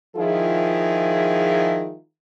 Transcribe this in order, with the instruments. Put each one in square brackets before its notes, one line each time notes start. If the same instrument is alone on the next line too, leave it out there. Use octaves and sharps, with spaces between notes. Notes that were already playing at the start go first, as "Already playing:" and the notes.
[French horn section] D#3 F3 G#3 E4 F4 G#4